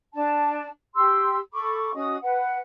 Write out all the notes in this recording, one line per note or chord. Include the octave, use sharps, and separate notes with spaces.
D4 A5
G4 C6 E6
A4 B5 C#6 D6
C#4 F#4 D#5 D#6
B4 F#5